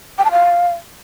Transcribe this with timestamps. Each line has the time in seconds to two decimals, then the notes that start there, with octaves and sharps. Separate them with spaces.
0.18 G5
0.25 A5
0.31 F5